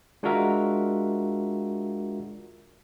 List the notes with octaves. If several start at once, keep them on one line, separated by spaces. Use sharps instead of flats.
G#3 D4 F4 F#4 A#4 E5